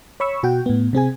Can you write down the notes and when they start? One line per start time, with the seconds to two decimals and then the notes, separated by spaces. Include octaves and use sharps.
0.20 C#5 B5 C#6 E6
0.43 B2 F#4 F#5 G5
0.66 A2 B3
0.93 C3 C4 G#4 G#5